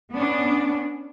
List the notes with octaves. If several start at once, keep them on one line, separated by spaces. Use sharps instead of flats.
B3 C#4 D4